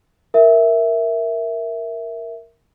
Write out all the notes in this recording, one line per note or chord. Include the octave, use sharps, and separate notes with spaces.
A#4 E5